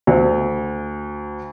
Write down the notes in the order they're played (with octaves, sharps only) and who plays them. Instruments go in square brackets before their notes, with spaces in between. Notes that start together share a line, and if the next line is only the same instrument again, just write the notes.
[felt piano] D2